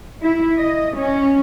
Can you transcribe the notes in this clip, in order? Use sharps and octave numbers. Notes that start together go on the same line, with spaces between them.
E4
D#5
C#4